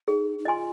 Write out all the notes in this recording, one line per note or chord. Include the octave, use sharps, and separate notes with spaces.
D#4 G#4
D#4
F4 D#5 G#5 C6